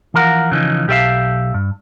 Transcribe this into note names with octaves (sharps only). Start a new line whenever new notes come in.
E3 F3 A#4 F5 F#5
C#3 E3 F3 D#4
B1 G4 A4 B4 E5 F5
G2